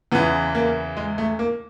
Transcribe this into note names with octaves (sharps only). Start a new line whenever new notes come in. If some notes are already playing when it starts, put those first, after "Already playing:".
E2 C#3 E3 B3
A#3
G#3
A3
A#3